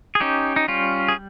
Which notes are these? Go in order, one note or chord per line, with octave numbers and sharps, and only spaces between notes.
G#4
C#4 D#4 G4
D#4
G3 C#4 F4
G#4